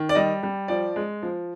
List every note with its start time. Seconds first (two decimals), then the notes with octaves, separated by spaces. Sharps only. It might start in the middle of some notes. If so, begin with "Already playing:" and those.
Already playing: D#3
0.09 D5
0.15 G3 D#5
0.43 G3
0.68 F3 D5
0.96 G#3
1.22 F3